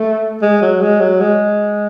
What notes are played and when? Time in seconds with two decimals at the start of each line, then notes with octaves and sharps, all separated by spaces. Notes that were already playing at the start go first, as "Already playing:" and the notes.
Already playing: A3
0.42 G#3
0.62 F#3
0.81 G#3
1.00 F#3
1.20 G#3